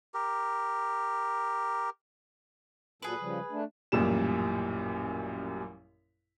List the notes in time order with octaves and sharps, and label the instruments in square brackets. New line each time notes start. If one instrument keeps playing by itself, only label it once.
[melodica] G4 A#4
[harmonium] A#2 F#3 A4 [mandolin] G#4 B4
[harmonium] C#3 F3 G3
A3 D4
[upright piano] A1 F#2 A#2 G3 E7